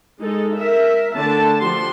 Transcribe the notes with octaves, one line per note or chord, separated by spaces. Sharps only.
G#3 D#4 A4
A#4 E5
D3 A3 A5
D3 F3 G4 C6